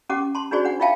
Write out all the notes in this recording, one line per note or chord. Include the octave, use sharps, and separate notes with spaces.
C#4 G4 F#5 D6
A5 C6
D4 D#4 F#4 G#4 C5 D5
D4 F#5
D#4 F4 E5 F5 G5 A5